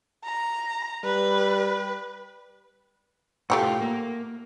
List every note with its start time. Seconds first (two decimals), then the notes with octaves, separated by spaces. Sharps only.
0.25 A#5
1.04 G3 B4
3.50 A2 A3 F4 G4 F#5
3.81 A#3